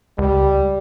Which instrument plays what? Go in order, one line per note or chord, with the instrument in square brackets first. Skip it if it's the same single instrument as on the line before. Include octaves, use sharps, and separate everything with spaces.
[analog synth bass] C#2 [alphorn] G3